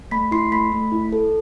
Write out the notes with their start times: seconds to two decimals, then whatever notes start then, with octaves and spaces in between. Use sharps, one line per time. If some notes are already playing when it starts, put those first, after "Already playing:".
0.11 A3 B5 B6
0.31 E4 C6 C7
0.52 A3 B5 B6
0.72 A3
0.92 E4
1.12 A4